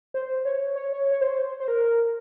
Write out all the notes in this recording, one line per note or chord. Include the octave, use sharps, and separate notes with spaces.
C5
C#5
C#5
C#5
C#5
C5
C5
A#4